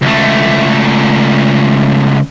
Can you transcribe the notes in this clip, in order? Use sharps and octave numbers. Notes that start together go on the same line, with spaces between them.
C#2 A3